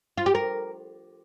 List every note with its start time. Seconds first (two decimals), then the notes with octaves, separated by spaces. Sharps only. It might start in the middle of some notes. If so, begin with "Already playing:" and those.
0.17 F4
0.26 G4
0.35 A#4